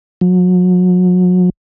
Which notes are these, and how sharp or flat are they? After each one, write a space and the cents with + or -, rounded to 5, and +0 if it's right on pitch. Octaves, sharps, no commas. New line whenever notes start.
F#3 -35